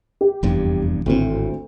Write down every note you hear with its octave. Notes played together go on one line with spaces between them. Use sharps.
G4
F1 E2 G2
G#1 D2 A2 C4